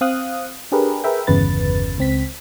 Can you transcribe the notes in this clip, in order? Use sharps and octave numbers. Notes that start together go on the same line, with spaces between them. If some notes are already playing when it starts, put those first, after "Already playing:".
C4 F5 D#6 F#6
D4 G4 G#4 A#4 B4
G#4 A#4 B4 E5 G5
G1 E2 C#3 B4 A6
C#2 C4 B6